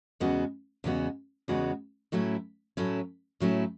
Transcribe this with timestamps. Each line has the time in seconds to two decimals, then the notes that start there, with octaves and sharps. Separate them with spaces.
0.20 E2 C#3 G#3 B3 F#4
0.84 E2 C#3 G#3 B3 F#4
1.48 E2 C#3 G#3 B3 F#4
2.12 A2 F#3 A3 C#4 E4
2.77 A2 F#3 A3 C#4 E4
3.40 A2 F#3 A3 C#4 E4